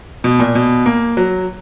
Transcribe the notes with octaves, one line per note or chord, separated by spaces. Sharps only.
B2
A#2
B2
A#3
F#3